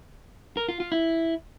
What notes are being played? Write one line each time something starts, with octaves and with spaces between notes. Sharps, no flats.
A#4
F4
F4
E4